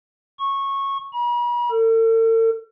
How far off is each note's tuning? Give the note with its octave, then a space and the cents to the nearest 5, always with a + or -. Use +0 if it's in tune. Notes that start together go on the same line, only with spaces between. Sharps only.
C#6 -15
B5 -45
A4 +45